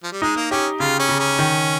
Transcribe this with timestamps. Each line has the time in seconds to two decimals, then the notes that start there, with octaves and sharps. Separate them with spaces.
0.03 F3
0.12 G3
0.22 G#3 D#4
0.36 A#3
0.51 C#4 G4
0.80 C#3 F4
0.99 C#4
1.09 C#3
1.19 C#4
1.39 D#3